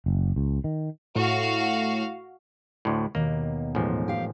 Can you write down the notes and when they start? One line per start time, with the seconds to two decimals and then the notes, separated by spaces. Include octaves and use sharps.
0.06 F#1
0.36 C#2
0.64 D#3
1.15 A2 F#4 F5
2.85 D2 A2
3.15 D#2 B2 A#3
3.75 A1 G#2 F3
4.08 G4 F5